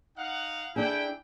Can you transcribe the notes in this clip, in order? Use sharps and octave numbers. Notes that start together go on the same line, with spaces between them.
D#4 F5 F#5
D4 E4 G#4 G5